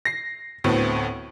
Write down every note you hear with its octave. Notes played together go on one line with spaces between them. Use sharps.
A#6 C7
D2 A2 A3 B3 C4